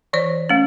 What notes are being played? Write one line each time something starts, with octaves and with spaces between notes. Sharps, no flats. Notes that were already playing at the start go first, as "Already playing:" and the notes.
E3 C5 D5
A3 C#4